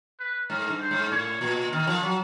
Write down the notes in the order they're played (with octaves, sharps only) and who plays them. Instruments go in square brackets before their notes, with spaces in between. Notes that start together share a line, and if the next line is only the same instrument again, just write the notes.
[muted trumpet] B4
[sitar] G#2 [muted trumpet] A#4
[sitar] G2
[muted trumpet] C5
[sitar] G#2
[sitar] A2 [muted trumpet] C#5
[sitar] A#2
[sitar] D#3 [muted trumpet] A#4
[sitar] F3
F#3